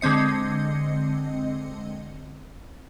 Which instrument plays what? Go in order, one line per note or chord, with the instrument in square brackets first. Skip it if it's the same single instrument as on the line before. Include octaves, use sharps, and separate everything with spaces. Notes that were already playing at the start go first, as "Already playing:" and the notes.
[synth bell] D3 G#3 C4 D#5 C#7